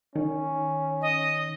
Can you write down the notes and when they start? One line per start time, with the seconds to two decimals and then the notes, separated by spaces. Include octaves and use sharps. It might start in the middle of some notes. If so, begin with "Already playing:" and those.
0.15 D#3 C#4
1.01 D#5